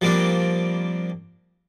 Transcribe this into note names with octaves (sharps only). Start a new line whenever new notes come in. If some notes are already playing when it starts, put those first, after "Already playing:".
F3 G3 A#3 C4 D4